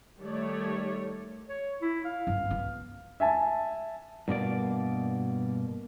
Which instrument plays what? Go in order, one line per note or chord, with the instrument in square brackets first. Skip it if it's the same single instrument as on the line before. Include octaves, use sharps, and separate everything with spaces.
[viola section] D#3 G3 A3 G4 C#5 D5
[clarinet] C#5
E4
F5
[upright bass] G2
B3
[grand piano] E5 G#5 A5
[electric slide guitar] G2 B2 A#3 D5